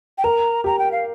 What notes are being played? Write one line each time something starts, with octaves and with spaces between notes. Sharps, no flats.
G5
A#4 A#5
G4 A#5
G5
F5